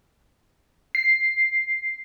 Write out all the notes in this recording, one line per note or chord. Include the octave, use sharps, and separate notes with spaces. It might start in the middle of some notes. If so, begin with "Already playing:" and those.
C7